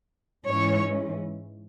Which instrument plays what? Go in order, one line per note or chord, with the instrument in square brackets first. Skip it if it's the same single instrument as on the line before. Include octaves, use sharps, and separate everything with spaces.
[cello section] G#2 E3 G#3 C#4 C#5